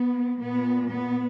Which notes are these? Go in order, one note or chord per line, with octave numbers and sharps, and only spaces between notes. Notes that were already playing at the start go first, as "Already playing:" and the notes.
Already playing: B3
A#2 B3
B3